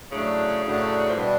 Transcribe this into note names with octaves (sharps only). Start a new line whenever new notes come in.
A2 C#3 F#3 A3 D4
A2 F#3 A3 D4
F3
B2 E3 G3 B3 D4